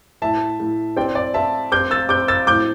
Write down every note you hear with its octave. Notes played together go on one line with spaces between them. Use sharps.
A2 E5 A5
A2
C4 D5 G5
D5
C4 E5 A5
C4 D6 G6
E6 A6
C4 D6 G6
E6 A6
A2 D6 G6